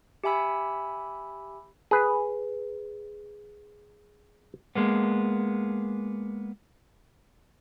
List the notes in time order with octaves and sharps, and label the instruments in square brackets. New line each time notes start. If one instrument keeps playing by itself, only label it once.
[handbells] G4 E5 G#5 B5 E6
[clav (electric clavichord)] G#4 B4
[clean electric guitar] G#3 A#3 B3